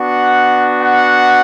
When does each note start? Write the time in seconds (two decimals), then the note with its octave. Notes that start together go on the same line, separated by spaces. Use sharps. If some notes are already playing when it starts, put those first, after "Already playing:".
Already playing: B3 D4 F#4 F#5
0.79 F#5